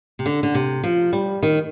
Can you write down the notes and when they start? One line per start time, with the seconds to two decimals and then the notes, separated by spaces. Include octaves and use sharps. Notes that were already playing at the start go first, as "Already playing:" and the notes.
0.19 C3
0.26 D3
0.43 D3
0.55 C3
0.84 F3
1.13 G3
1.43 D#3